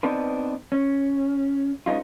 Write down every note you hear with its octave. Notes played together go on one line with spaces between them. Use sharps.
B3 C4 D4 D#4 B4
C#4
G#3 B3 C#4 D#4 F4